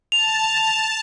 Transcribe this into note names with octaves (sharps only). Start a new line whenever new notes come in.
A5 F7